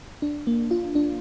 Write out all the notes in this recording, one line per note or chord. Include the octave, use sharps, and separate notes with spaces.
D4
A#3
F4
D4